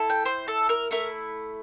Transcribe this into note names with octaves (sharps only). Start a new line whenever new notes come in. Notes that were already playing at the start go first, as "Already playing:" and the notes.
Already playing: E4 A4
G5
C5
A4
A#4
A3 E4 A#4